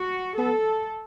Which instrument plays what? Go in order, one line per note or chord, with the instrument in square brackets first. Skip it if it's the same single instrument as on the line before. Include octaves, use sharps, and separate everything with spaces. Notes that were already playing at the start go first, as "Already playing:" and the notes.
Already playing: [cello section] F#4
[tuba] B3 [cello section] A4